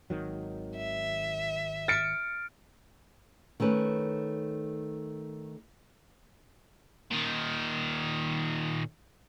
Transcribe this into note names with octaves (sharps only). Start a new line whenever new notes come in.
G#1 D#3 F#3
E5
F6 A6 C#7 D7
D#3 A3 C#4 B4
A#2 D#3